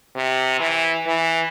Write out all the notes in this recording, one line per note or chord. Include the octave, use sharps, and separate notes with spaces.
C3
E3
E3